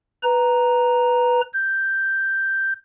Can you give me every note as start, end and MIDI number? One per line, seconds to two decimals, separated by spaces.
0.23 1.41 71
0.23 1.41 82
1.53 2.73 91